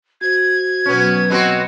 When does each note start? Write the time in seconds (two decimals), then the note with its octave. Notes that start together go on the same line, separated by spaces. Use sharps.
0.21 F#4 C5 G#6
0.86 B2 F#3 B3 C#4
1.30 B3 C4 F#4 D#5 B5 C6